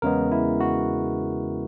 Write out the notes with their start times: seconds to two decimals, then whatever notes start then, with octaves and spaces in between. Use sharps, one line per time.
0.02 E2 C#3 G#3 B3 A#4
0.32 E4
0.60 F#4